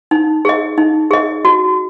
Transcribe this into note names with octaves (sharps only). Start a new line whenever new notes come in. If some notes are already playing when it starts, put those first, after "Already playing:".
D#4
G#4 D#5
D#4
G#4 D#5
F#4